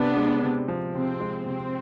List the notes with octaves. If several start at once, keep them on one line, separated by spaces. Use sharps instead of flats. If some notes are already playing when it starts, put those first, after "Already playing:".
Already playing: C3 B3 D4
G#3
C3
F3
C3 C4
G#3
C3 C4